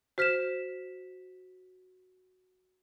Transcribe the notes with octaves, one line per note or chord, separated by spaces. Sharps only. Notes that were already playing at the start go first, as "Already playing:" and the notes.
F#4 C5 F6 B6 E7